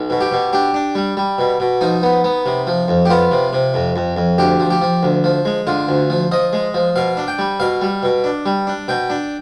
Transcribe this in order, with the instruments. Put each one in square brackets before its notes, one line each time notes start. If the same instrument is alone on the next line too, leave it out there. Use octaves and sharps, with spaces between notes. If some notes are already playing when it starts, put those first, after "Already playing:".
Already playing: [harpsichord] B1
B2
G4
B2
D4 G4
D4
G3
G3
B2
B2
F3 D#4
B3
B3
C3
F3
F2
G4
B3 F4
C3
C3
F2
F2
F2
D2 G4
F3
G4
F3
D2
F3
G#3
D3 F4
D2
F3
F3 D#5
G#3
F3
B2 F5
D4
G5
G3
B2 F5
G3
B2
D4
G3
D4
B2 G5
D4